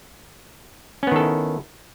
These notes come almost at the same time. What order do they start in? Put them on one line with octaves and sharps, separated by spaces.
C#4 B3 D#3 A4 E4